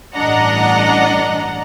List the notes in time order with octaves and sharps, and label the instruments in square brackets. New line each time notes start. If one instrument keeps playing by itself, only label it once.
[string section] A1 G2 D4 D#5 F#5 A#5